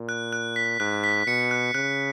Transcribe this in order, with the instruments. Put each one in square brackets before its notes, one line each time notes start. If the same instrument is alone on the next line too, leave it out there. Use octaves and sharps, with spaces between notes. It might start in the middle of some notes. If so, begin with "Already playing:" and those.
Already playing: [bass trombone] A#2
[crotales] F#6
F#6
B6
[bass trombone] G#2 [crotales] F#6
[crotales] B6
[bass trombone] B2 [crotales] C#7
[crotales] F#6
[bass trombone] C#3 [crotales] F#6